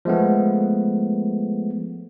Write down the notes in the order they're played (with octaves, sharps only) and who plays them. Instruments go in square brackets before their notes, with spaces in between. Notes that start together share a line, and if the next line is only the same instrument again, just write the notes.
[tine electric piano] F3 G#3 A3 B3